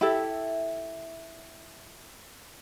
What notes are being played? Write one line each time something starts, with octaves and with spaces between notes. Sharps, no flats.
E4 G4 A4 E5